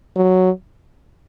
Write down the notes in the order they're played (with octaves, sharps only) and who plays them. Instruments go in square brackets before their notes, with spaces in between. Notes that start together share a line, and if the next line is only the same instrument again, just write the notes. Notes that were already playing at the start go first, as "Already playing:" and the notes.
[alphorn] F#3